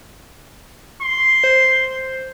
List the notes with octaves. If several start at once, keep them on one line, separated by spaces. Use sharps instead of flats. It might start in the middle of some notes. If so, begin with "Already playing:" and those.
C6
C5